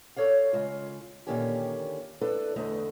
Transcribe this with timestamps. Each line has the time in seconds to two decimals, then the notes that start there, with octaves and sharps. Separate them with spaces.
0.16 A4 C#5 D5 F5
0.53 C#3 G#3 F4
1.27 A#2 D3 D#3 A#3 C#4 G4
2.21 D4 E4 A4 B4 D5
2.56 E2 D3 A3 D#5